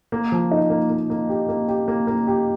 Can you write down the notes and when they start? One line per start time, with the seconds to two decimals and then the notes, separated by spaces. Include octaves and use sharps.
0.12 A#3
0.32 F3
0.51 D#4
0.70 A#3
0.90 A#3
1.10 A#3
1.29 G4
1.49 A#3
1.68 G4
1.88 A#3
2.07 A#3
2.27 G4